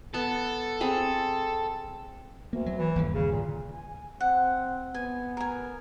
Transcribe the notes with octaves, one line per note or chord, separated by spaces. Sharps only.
B3 A4
C4 G#4 B5
D2 A#3
F#3
E3
G1 D#2 D3
C#3
A#2
G#5
C4 F#5
B3 G#5
A#4 G#5